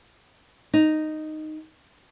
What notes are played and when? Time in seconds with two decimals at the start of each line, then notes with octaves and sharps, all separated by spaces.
0.74 D#4